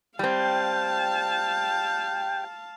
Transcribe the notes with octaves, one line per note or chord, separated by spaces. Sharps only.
G3 C4 F5 G5 A5